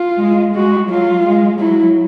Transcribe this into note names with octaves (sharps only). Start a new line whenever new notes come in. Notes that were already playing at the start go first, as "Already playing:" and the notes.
Already playing: F4
G#3
G#3 F#4
F#3 F4
G#3
F#3 E4